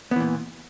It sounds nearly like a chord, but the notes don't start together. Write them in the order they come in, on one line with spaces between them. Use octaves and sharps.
B3 E3 A#2